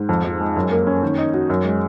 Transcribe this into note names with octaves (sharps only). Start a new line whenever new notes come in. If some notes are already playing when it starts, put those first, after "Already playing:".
Already playing: G#2
F2
F3
G#3
F#2
A#3
C#4
D#3
D#4
F#4
F#2
G#3